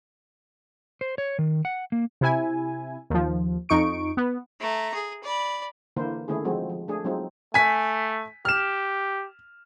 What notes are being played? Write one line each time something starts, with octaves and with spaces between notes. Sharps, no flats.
C5
C#5
D#3
F#5
A#3
C3 E4 G#5
D#2 F3
F2 D#4 C#6 D7
B3
A3 A#5
G#4
D5 B5
D3 E3 A#3 E4 A#4 C5
D3 D#3 A3 C#4 E4 G#4
F3 G#3 C4 F#4
F3
A3 D4 G#4
F#3 G#3 C4 D#4 F4
A3 G#5 B6
G4 F6 E7